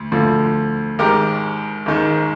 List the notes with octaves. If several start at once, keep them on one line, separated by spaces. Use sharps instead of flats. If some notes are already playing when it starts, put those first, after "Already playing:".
Already playing: D2
D2 D3 F3
G#1 G#2 D#3 G4 A#4
G#1 G#2 D#3